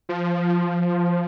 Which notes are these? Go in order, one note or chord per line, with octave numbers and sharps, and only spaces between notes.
F3